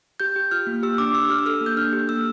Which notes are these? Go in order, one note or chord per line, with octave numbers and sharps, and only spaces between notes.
G4 G6
G4
F4 F6
A#3
G4 E6
D4 D6
D4 E6
G4 F6
E6
A4 F6
A#3
G6
D4 F6
G4
A#3 E6